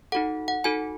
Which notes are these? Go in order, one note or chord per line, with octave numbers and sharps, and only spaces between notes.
D#4 F#4 A4 F#5
F#5
D#4 F#4 A4 G#5